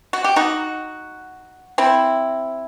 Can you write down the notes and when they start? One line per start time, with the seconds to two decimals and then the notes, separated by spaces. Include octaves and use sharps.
0.13 F#4
0.24 G4
0.36 D#4 F#4
1.78 C4 E4